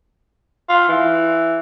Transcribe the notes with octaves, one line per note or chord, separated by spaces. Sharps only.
F4
E3